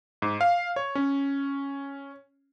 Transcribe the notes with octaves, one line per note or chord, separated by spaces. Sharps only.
G#2
F5
C#5
C#4